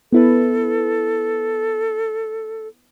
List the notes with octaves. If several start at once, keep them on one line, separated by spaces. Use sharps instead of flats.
B3 E4 A4 B4